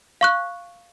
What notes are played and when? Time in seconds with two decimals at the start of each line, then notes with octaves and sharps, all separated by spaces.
0.21 F5 C#6 F#6